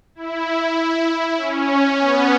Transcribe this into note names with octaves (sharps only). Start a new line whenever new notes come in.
E4
C#4
B3